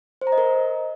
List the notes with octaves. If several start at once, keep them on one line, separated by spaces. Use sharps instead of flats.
C5
A#5
D#5
A#4